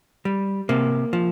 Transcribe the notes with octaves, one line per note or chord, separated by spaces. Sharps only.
G3
C3 A#3
F3